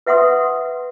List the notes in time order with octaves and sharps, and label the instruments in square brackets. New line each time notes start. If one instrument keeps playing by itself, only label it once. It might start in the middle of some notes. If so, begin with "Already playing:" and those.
[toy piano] B4 E5 F#5 C6 D#6